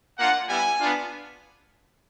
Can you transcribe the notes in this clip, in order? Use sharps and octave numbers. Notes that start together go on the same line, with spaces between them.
A#3 D4 F4 F#5
G3 B3 E4 G4 G#5
B3 D4 F4